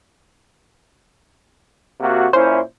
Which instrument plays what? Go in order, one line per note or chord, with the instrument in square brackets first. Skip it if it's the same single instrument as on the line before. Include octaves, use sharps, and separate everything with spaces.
[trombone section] C3 A#3 F#4
[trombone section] A#2 C#4 E4 [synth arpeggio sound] C5